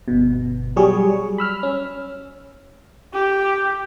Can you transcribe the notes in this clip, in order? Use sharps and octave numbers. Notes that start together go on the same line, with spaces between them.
G1 B2
F#3 G3 G#4 C#6
B5 E6 F6
C#4
G4